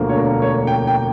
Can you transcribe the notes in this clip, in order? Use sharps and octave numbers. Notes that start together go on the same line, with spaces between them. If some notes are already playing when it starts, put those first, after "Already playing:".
Already playing: E1 D2 D3 F3 A#3
C#5
A#4
C#5
G5
G5